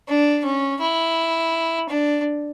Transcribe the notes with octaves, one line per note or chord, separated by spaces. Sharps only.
D4
C#4
E4
D4